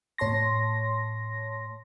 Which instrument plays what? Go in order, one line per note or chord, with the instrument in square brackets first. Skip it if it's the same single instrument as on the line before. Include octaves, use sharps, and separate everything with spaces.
[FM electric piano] A2 C#5 A5 C6 A#6